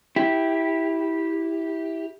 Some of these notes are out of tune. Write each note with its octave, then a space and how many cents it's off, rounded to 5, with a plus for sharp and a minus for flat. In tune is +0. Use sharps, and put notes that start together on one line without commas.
E4 -10 G4 +0